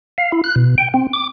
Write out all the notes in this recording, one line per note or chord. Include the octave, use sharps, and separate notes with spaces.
F5
E4
F#6
B2
G5
C4
D6